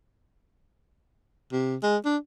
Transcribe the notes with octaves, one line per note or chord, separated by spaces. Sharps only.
C3
G#3
D4